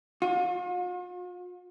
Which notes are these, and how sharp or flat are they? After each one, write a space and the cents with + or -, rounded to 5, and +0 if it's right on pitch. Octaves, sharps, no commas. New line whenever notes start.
F4 +45